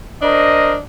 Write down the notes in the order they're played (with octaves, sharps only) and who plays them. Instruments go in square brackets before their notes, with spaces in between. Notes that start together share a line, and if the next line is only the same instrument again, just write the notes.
[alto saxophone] D4 [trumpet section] A#4 C5 D#5